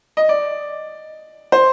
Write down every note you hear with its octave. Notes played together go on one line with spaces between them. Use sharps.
D#5
D5
C5